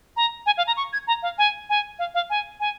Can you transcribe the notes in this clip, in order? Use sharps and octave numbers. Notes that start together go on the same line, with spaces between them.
A#5
G#5
F5
A#5
C#6
G#6
A#5
F5
G#5
G#5
F5
F5
G#5
G#5